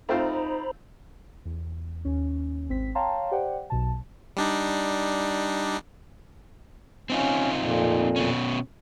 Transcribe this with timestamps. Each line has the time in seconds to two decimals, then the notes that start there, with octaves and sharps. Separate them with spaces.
0.09 A3 C4 D#4 F4 C5 A#5 B5
1.45 E2
2.05 D#2 C#4
2.69 G#1 C4 B6
2.95 C#5 F5 G5 A5 A#5 C6
3.31 G4 C5 D5 F#5 G5
3.70 B1 B2 A5
4.37 G3 D4 D#4
7.10 C4 C#4 D#4 F4
7.55 F2 A#2
8.16 B2 C#4